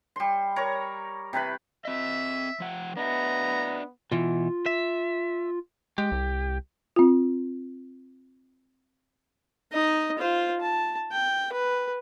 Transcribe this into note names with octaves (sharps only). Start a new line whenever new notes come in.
G3 C6
A#4 C#5 A#5
C3 E4 B4 B5
C4 D#5 E5
F3 F#5 G5
B3 D4 D#5 E5 A#5
B2 E3 F4
E5
G#3 G4
C2
C4 F4
D#4 D#5
F4 C5
A5
G5
B4